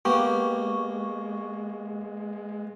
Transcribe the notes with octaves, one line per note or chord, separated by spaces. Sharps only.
G#3 A#3 B3 G4 G5 C#6 D6